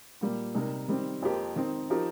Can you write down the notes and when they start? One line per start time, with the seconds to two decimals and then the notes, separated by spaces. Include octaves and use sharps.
0.21 A#2 G3 A#3
0.55 C3 G3 D#4 A#4
0.88 D#3 G3 C4
1.22 F2 F3 A#3 G4 A#4
1.56 D#3 C4 D#4
1.90 F3 D#4 G4 A#4